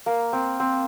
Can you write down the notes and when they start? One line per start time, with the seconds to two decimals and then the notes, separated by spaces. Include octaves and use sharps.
0.06 A#3
0.33 C4
0.60 C4